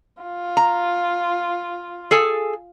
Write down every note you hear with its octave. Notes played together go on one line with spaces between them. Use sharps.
F4
A#5
G#4 A4 G#5